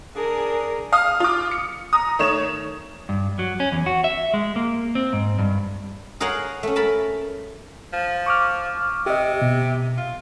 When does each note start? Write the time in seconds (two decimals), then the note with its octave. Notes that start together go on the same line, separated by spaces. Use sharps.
0.16 D4 G#4 A#4
0.92 F5 D#6
1.20 F4 D6
1.51 C#7
1.93 A#5 D#6
2.19 D#3 A3 C#5 E7
3.09 G2
3.39 F#3
3.60 C#4
3.72 E2
3.86 F#4
4.04 E5
4.34 G#3
4.56 A#3
4.95 C4
5.13 G#2
5.39 G2
6.20 G#4 A#4 C#5 F5 F#5
6.63 A3 C#4
6.76 A#4 A5 B5
7.93 F3
8.26 C#6 D6 F6
9.06 C3 G4 D#5
9.42 B2
9.97 F4